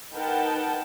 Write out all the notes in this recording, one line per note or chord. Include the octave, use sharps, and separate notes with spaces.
D#4 A#4 B4 F#5 G5 A5